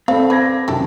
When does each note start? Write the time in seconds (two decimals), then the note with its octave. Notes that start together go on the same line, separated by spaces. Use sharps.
0.08 C4 A4 D5 F5 B5
0.30 B4 D6 G#6 A#6
0.68 F#2 C3 D#3 G4 A4